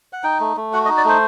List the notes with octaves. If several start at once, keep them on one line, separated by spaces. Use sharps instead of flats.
F#5
D#4 G5
A3
A3
F#4 F#5
D#5
D#4
D5
A3 C5